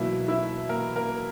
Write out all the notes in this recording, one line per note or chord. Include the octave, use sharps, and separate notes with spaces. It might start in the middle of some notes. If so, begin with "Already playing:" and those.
Already playing: B2 F#3 A#3 E4 E5
E4 E5
A#3 A#4
A#3 A#4